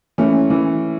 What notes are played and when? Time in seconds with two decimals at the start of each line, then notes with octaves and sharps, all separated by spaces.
0.18 E3 A3 C#4
0.50 E3